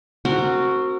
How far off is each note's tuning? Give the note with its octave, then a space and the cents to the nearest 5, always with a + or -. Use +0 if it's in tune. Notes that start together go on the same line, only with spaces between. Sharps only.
C4 +20 F#4 +0 A#4 -20